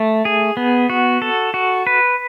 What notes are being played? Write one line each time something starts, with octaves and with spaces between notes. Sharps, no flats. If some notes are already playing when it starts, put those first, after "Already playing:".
Already playing: A3
G#4
B3
F#4
A4
F#4
B4